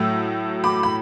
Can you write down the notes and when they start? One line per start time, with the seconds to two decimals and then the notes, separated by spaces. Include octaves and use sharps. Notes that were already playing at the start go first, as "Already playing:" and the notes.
Already playing: A2 F#3 A3 E6
0.64 B5 D6
0.83 B5